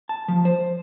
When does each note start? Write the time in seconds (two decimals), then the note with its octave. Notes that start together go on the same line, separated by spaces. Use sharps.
0.09 A5
0.28 F3
0.45 C5